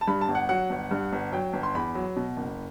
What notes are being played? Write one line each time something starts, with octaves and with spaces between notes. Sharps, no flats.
A5
G2 B5
A5
G1
F#5
F#3 F#5
G1
G2
G1
F#3 G5
G1
C6
E2 B5
F#3
B2
F#1